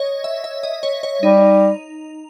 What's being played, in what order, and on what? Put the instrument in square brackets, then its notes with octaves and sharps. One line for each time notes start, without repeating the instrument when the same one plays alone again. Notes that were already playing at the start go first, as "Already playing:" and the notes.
Already playing: [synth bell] C#5 D#5
E5
E5
D#5
C#5
C#5
[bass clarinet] G3 [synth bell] D#4